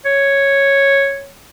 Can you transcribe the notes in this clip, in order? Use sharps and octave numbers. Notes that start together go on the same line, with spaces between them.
C#5